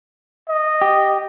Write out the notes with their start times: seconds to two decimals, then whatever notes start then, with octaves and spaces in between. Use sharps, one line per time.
0.49 D#5
0.82 G4